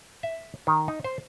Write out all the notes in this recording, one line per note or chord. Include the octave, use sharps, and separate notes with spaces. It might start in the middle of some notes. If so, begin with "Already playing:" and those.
E5
D#3
D#4
C5